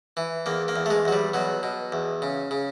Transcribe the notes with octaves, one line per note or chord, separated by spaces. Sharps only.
E3
E2 A#3
A#3
E2
A3
G#3
E2 F#3
G3
B2 F#3
B2
E2
C#3
C#3